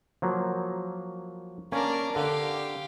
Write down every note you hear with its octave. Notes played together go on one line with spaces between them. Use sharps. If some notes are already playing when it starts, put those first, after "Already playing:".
F3 F#3 A#3
A#3 C#4 D4 A#4
D3 G4 F5